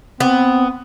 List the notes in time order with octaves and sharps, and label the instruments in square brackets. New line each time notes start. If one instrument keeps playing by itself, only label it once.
[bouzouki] B3 [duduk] C4